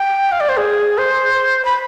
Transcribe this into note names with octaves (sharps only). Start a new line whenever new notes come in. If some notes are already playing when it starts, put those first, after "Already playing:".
Already playing: G5
F5
D5
C5
G#4
C5
B5